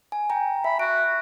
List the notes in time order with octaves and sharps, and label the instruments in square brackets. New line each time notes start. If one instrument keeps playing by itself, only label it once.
[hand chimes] G#5
G5 A#5
[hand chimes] E5 [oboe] B5
[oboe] F#4 [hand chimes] D7